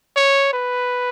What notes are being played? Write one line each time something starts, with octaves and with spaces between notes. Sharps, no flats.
C#5
B4